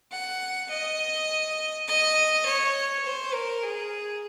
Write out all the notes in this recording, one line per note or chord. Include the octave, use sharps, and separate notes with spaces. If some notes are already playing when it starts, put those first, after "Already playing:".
F#5
D#5
D#5
C#5
C5
A#4
G#4